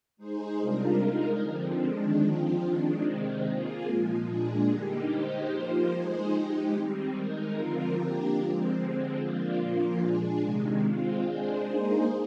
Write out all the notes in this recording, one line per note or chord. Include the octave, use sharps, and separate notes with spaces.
G#3 D#4 G#4 C5
C3 G3 D4 F4 A#4
G#3 D#4 A#4
D3 F3 C4
D#3 G#3 D4
F3 C4 F4
D#3 G#3 D4
C3 D#3 G#3 C4
A#3 F4 G#4
A#2 F3 G#3
A#2 G#3 D4 G#4
D3 G3 A#3 D#4 G4
G#3 D#4 G4 C5
F3 A#3 F4 C5
G#3 D#4 G#4 C5
G#3 D#4 G4
D#3 G3 C4
G#3 D#4 A#4
D3 F3 C4 F4 A#4
A#3 D4 G4 A#4
F3 G#3 C4
D3 G#3 C4
F3 A#3 D4 F4
A#2 F3 A#3 F4
G#3 D4 G#4
C3 D#3 G#3
G#3 C4 F4
G#3 D4 G#4 C5
A#3 D#4 G#4 C5